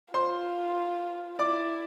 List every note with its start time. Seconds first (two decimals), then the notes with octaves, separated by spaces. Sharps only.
0.14 F4 C5 C6
1.39 E4 D5 D6